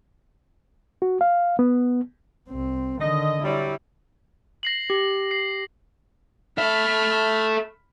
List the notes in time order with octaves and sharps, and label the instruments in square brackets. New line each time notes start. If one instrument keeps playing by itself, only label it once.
[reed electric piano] F#4
F5
B3
[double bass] C2 C4
[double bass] D3 D#3 [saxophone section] D#5
[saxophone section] F#3 G3 [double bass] E4
[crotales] A#6 C7 F#7
[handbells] G4
[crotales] C7
[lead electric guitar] A4 E5 [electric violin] B5 F6